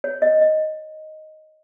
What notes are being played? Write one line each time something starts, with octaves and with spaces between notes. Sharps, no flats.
C#5
D#5
D#5